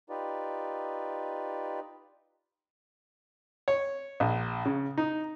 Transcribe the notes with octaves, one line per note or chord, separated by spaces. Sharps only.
D#4 F4 G4 B4 D5
C#5
A#1
C#3
D#4